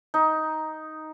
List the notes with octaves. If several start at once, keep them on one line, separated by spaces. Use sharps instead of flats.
D#4